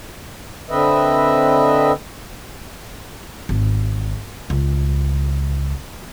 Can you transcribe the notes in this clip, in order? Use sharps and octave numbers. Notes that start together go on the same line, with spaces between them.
D3 C4 B4 D#5 E5
G#1
C#2